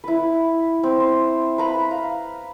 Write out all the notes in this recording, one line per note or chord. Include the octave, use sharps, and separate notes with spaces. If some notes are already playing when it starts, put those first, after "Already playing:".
E4 B4
C4
C5
B4 A#5 B5
F5